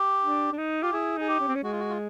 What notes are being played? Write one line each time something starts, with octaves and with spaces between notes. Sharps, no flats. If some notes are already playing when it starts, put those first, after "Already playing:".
Already playing: G4
D4
D4
D#4
F4 G4
E4 G#4
D#4 G#4
G4
C#4
C4
C#4
G#3 F#4
F4
F#4
F4